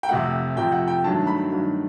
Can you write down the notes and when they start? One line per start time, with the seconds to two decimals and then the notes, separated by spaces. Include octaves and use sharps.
0.03 G5
0.08 F2 C3 F3 A3 F#5
0.56 F2 C3 F3 A3 G5
0.72 F#5
0.88 G5
1.04 G2 D#3 F#3 A3 D4 A5
1.27 B5
1.51 G2 D#3 F#3 A3 D4